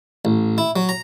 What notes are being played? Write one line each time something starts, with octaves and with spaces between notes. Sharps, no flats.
A1
E4
F#3
A#5